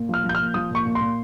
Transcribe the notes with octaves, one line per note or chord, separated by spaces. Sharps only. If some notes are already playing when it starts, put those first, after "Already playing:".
Already playing: A#2
F3 F6
F3
G6
A#2 F6
F3 D#6
A#2 C#6
A#2
C6
A#2